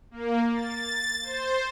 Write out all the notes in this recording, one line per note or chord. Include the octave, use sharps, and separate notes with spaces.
A#3
A6
C5